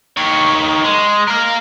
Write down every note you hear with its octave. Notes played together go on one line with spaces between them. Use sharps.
D#3 C#5
G#3
A#4 F5